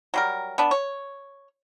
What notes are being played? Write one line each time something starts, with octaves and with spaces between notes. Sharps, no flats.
F#3 G3 A#4
B3 D4
C#5